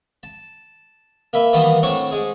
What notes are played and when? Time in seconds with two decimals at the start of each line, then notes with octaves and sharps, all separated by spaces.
0.23 A5
1.33 A#3 B4 E5
1.53 D#3 E3 G3 A#3 B3 D#4
1.83 A2 C4 D4 C#5 F#5 C#6
2.11 G#2 G#4